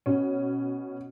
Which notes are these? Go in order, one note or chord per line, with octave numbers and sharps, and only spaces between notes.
B2 C#4